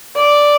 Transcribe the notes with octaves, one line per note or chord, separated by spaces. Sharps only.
D5